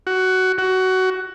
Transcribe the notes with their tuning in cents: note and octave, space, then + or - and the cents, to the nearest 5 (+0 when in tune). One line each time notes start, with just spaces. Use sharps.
F#4 +10
F#4 +15